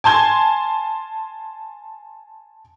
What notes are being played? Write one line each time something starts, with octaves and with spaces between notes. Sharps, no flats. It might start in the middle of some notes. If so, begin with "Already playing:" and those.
G#5 A5 C6 G#6